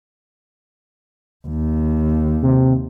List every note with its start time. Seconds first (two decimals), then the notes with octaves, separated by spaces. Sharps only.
1.47 D#2
2.43 C3